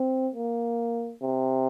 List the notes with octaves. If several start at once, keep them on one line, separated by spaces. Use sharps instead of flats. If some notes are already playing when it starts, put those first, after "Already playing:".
Already playing: C4
A#3
C3